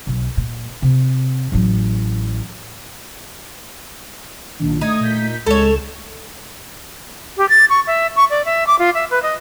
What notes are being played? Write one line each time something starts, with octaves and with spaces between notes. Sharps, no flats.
B1
A#2
C3
A1 F#3
B1 A#2 D#3 D4
A3 D#4 D#6 G#6
A#2 G6 B6
C#2 G#3 A4 C#5 E7
G4
A6
C#6
E5
C#6
D5
E5
D6
F4
E5
B4
D#5